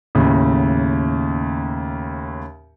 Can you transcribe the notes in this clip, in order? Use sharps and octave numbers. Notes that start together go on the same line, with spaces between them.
D#2 A2 C#3